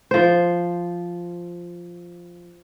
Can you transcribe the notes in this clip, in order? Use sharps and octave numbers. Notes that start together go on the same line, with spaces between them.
F3 C5